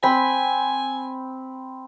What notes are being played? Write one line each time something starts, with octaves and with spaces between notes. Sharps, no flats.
C4 G5 G#5 B5 B6